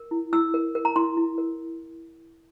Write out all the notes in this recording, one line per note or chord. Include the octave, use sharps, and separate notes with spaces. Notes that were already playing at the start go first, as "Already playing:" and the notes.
Already playing: A#4
E4
E4 E6
A#4
A#4
A#5
E4 C6
E4
A#4